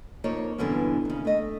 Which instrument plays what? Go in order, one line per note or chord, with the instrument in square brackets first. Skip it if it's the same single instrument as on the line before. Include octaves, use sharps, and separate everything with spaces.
[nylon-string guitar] F2 A#3 D#4 F4 C#5
G2 B2 D3 E3 B3 C#4
D#2 C#3
A3 D#5